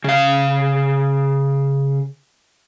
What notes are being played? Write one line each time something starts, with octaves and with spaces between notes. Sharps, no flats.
C#3 F5